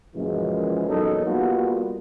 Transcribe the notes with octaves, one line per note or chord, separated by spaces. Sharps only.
F#2 A#2 C#3 E3 F3 G#3
E2 F#3 A#3 D#4 A4
G3 A#3 B3 F4 F#4